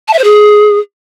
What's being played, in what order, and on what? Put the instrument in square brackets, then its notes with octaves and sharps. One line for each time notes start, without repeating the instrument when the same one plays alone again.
[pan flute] A5
E5
C5
G#4